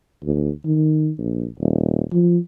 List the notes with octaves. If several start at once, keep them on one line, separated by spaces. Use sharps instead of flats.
D2
D#3
A#1
D#1
F3